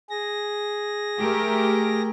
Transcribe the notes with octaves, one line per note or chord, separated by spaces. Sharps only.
G#4 A#6
A3 G4 A#4